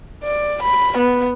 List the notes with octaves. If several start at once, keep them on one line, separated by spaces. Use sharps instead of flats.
D5
B5
B3